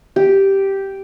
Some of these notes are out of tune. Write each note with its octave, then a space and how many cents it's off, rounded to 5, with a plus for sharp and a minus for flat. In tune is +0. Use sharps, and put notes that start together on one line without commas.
G4 -5